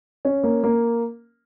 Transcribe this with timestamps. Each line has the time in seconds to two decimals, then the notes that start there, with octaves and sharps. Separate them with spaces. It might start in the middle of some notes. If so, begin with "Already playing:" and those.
0.25 C#4
0.43 A#3
0.64 A#3